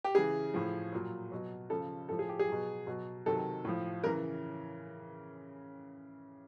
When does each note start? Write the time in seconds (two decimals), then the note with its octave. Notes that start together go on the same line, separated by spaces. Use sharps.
0.04 G4
0.15 C#3 E3 G#4
0.54 A2 F3
0.92 A#2 F#3
1.32 B2 F#3
1.70 C#3 F3 A4
2.09 A2 F3 A4
2.19 G#4
2.29 G4
2.39 G#4
2.48 B2 F#3
2.87 B2 F#3
3.26 C3 D#3 F#3 A4
3.65 A2 F3
4.04 C#3 E3 A#4